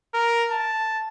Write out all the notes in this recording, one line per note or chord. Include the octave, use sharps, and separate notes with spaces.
A#4
A5